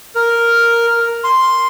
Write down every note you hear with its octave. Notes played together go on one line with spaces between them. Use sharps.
A#4
C6